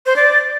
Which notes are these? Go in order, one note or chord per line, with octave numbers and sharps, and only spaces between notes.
C5
D5